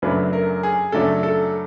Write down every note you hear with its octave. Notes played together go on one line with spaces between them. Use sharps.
F#2 C#3 F#3 A3 D4 B4
A#4
G#4
F#2 C#3 F#3 A3 D4 A4
A4